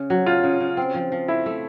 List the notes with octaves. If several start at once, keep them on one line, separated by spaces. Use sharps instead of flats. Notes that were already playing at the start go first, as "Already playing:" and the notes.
Already playing: C#3
F#3
C#3 F4
C#3
C#3
C4
F3
F3
A3 E4
A3